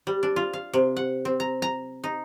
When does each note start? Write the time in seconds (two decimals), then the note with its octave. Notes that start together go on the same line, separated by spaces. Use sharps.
0.07 G3
0.23 D4
0.36 F4
0.53 F5
0.74 C3
0.96 F#5
1.25 C4
1.40 A#5
1.62 A#5
2.04 D#4